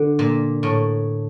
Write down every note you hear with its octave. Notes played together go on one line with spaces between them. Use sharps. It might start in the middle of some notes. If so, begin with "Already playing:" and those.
Already playing: D3
A#2
A2